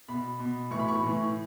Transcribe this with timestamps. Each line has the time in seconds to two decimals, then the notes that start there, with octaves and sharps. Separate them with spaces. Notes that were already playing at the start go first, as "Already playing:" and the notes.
0.08 B2 B5
0.39 B2
0.71 A2 E3 C#6
0.80 B5
0.88 C#6
1.03 A2 E3